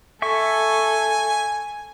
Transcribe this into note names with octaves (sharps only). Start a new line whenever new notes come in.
A4 E5 G#5 C#6